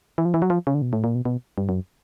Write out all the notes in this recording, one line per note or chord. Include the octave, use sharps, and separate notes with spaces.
E3
F3
E3
F#3
F3
C#3
D3
B2
A2
A#2
B2
B2
G2
F#2